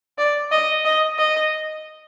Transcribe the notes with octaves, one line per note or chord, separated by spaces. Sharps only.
D5
D#5
D#5
D#5